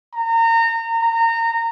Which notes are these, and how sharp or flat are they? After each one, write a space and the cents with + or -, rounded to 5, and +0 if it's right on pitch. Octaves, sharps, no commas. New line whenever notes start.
A#5 -30
A#5 -25